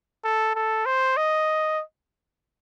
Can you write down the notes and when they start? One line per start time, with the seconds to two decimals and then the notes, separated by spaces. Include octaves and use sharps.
0.24 A4
0.55 A4
0.86 C5
1.17 D#5